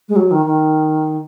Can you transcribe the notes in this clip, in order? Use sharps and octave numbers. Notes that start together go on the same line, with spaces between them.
G#3
F#3
D#3
D#3